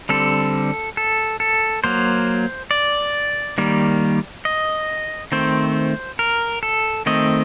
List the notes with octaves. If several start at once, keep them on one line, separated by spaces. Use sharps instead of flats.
D3 G3 C4 A4
A4
A4
F#3 A#3 C5
D5
D#3 G3 A#3
D#5
D#3 A3 C4 C5
A#4
A4
D#3 A3 C4 D#5